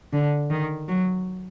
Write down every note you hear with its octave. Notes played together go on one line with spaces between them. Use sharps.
D3
D#3
F#3